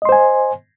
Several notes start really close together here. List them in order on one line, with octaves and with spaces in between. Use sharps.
D#5 C6 C5 G#5